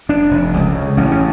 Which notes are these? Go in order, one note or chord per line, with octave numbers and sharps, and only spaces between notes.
F1 D4
F1
C#2
C#3
A1 C#4
C#4